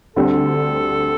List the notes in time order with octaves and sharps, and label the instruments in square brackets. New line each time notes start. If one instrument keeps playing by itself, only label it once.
[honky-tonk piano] D2 D3 G3 C4 [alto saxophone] A4